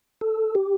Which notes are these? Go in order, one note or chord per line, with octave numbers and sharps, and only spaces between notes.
A4
G4